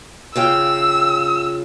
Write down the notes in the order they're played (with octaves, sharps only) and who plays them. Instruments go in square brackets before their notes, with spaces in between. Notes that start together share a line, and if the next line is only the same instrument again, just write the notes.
[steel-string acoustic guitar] C#3 F4 G5 [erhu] E6